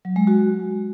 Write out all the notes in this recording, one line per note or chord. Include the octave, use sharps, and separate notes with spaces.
F#3
G#3
F#4